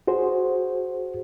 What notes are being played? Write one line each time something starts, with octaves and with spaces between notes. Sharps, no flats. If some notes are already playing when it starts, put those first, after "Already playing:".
F#4 G#4 C5